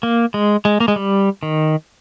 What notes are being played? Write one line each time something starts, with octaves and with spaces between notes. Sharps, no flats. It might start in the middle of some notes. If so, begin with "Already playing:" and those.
A#3
G#3
G#3
A#3
G#3
G3
D#3